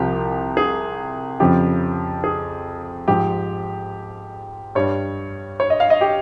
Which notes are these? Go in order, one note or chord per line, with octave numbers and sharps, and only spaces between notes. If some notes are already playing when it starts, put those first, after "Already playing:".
Already playing: C2 C3 F3 G4
G#4
F2 C#3 F3 G4
G#4
G#2 F3 G4
G2 G3 C#5
C#5
D#5
F5
D#5
G4